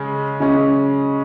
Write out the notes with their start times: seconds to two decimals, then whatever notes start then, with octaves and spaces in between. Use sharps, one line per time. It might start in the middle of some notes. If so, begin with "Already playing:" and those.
Already playing: C#3 G#3 C#4
0.40 C#3 G#3 C#4